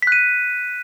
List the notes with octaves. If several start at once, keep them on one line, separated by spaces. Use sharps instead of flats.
F#6 B6 D#7